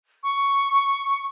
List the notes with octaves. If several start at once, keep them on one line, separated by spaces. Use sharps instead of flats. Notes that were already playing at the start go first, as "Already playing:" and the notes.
C#6